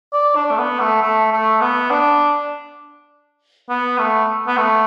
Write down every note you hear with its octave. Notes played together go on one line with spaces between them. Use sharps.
D5
D4
A3
B3
A3
A3
A3
B3
D4
B3
A3
B3
A3